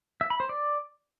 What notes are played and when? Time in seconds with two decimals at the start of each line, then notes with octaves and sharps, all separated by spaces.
0.21 E5
0.30 B5
0.40 C5
0.49 D5